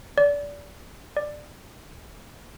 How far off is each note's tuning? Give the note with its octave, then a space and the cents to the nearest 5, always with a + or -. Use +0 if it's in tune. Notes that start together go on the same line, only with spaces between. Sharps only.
D5 -25
D5 +15